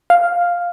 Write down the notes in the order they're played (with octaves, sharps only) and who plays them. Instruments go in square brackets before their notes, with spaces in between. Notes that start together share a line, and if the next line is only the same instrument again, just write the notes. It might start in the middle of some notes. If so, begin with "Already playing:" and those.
[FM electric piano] F5